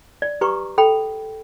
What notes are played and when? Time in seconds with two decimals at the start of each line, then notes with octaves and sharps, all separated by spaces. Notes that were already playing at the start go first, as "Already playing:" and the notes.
0.22 D5
0.41 G4 B4 A#5 C#6 D6
0.78 A4 G5 B5